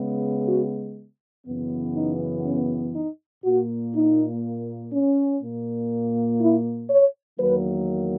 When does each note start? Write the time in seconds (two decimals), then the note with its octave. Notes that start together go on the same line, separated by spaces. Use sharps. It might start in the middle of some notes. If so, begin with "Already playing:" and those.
Already playing: C#3 G#3 B3
0.48 F#4
1.46 F#2 C#3 E3 B3
1.96 D#4
2.45 C#4
2.94 D#4
3.44 A#2 A#3 F#4
3.94 D#4
4.92 C#4
5.42 A#2 A#3
6.40 E4
6.90 C#5
7.39 E2 D#3 F#3 A#3 B4